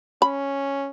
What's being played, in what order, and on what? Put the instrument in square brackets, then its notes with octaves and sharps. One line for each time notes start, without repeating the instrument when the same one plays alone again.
[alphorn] C#4 [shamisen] B5